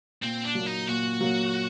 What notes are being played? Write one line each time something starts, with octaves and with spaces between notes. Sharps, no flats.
A#2 C4
D4
F#3 A#3
D#4
A#2 F#4
F#3 A#3